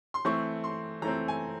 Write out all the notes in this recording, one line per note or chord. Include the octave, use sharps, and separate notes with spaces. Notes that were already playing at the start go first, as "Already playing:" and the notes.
C6
E3 A3 C4 C#6
C6
E3 A3 C4 A#5
G#5